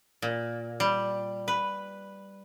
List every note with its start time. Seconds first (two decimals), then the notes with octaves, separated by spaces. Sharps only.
0.22 A#2
0.80 G3
1.48 B4